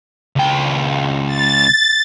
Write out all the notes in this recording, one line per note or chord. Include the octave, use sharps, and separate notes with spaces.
C#2 G5
A6